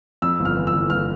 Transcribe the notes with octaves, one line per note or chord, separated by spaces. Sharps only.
F2 E6
G1
F6
E3
E6
G1
G1 F6